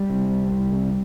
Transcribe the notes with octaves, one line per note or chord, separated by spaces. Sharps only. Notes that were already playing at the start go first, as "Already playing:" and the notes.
Already playing: G3
C3
C2
C2
C3